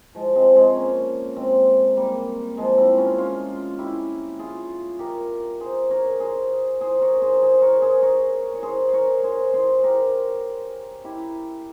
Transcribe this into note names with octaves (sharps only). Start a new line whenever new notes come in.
F3 G#3
G#3 C4
G#3 C4
A#3 C#4
G#3 C4
G3 A#3
F3 G#3
C4 E4
C#4 F4
C#4 F4
E4 G4
F4 G#4
G4 A#4
G#4 C5
A#4 C#5
G#4 C5
G#4 C5
A#4 C#5
G#4 C5
G#4 C5
A#4 C#5
G#4 C5
A#4 C#5
C#5
G#4 C5
A#4 C#5
G#4 C5
G#4 C5
G4 A#4
E4 G4